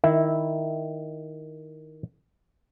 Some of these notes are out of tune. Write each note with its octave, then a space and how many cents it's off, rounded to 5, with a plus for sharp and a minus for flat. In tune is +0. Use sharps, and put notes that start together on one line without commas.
D#3 +0 E4 -5 E5 -20